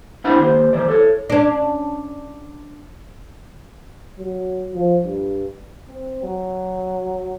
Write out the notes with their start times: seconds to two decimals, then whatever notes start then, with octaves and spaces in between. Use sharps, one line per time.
0.24 C4 D4 E4 C5 F#5 B5
0.39 D#2 C5
0.73 E3 C5 D5
0.88 A4 C#5
1.30 C#4 D4
4.18 F#3
4.74 F3
5.03 G2
5.88 C4
6.23 F#3